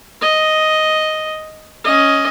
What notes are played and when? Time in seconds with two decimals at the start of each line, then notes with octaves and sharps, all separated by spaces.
0.21 D#5
1.85 C#4 D#5